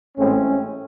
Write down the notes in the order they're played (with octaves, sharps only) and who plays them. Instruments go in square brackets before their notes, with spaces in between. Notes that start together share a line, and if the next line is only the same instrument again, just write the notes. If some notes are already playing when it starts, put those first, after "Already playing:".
[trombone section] A1 A2 G#3 C4 C#4